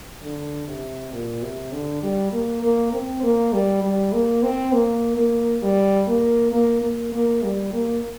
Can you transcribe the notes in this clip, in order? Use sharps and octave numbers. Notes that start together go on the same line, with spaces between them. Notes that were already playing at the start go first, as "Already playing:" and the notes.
D3
C3
A#2
C3
D3
G3
A#3
A#3
C4
A#3
G3
G3
A#3
C4
A#3
A#3
G3
A#3
A#3
A#3
A#3
G3
A#3